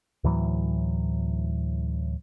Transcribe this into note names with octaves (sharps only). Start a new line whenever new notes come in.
D2 A2 E3 F#3